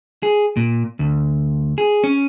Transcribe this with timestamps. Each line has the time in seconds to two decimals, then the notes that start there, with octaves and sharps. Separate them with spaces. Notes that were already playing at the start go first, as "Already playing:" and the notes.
0.23 G#4
0.57 A#2
0.99 D2
1.78 G#4
2.04 C#4